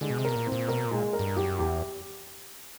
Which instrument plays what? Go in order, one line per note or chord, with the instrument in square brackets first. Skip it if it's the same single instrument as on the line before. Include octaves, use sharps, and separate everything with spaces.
[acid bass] D3 [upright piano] G#3
[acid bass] B2
C3
[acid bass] B2 [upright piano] A#4
[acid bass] A#2
[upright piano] C4
[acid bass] A#2
[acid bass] B2 [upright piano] A#4
[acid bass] A#2
[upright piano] G#3
A#4
[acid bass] G2
[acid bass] F#2 [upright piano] G4
[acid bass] E2 [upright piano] G4